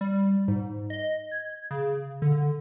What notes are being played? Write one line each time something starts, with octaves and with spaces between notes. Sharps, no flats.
G3
G#2
D#5
G#6
C#3
D3